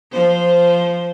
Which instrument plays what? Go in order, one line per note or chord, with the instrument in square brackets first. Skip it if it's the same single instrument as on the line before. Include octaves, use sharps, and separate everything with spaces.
[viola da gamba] F3 C5